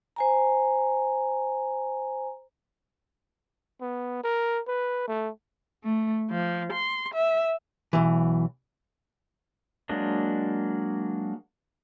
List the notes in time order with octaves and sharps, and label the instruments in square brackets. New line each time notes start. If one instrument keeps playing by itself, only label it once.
[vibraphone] C5 G#5 A#5
[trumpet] B3
A#4
B4
A3
[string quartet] A3
F3
C6
E5
[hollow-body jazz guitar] B1 E3
[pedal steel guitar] F#3 G#3 A#3 D4 D#5